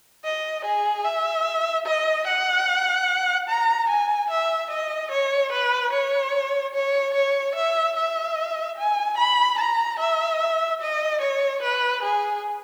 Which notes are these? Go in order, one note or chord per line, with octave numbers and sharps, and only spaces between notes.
D#5
G#4
E5
D#5
F#5
A#5
G#5
E5
D#5
C#5
B4
C#5
C#5
C#5
E5
E5
G#5
B5
A#5
E5
D#5
C#5
B4
G#4